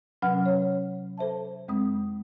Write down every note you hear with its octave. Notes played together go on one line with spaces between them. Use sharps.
C3 F#3 C#4 B4 F#5 F6
C#5
A4 C5 E5 A5
F2 G#3 C4 D#6